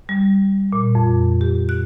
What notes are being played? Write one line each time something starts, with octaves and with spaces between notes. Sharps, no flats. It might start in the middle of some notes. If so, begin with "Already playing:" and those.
G3
A#2
F2
G4
F#6